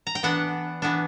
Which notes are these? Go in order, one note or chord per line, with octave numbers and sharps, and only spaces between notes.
A#5
G5
E3 B3 D4 F#5
E3 B3 D4